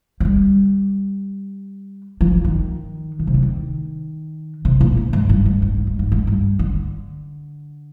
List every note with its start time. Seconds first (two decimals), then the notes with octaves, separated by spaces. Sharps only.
0.20 F3
0.25 G3
2.21 F3
2.45 D#3
3.19 A#2
3.27 C3
3.34 D3
3.43 D#3
4.65 C3
4.81 A#2
4.97 G#2
5.13 G#2
5.29 G2
5.46 G#2
5.62 G#2
5.75 G#2
5.87 G#2
5.99 G#2
6.12 G#2
6.27 G2
6.59 D3